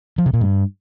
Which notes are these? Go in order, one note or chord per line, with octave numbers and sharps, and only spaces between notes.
F3
C3
A#2
G2